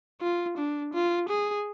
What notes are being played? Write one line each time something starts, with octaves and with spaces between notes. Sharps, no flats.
F4
D4
F4
G#4